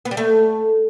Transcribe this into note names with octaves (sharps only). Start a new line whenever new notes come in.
B3
G3
A3